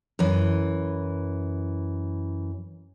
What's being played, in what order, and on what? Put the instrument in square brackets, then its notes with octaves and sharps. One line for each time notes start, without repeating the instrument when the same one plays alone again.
[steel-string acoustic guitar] F#2 E3